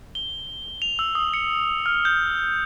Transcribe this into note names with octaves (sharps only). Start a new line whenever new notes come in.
G7
F7
E6
D#6
C#7
F6
G6